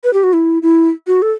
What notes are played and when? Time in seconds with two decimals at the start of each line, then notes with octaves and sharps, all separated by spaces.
0.04 B4
0.13 G4
0.23 F#4
0.33 E4
0.63 E4
1.07 F#4
1.22 A4